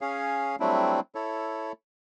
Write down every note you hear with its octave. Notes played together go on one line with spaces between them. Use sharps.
C#4 G#4 C#5 F5
F#3 G3 A3 C4 D4 E4
E4 A4 C#5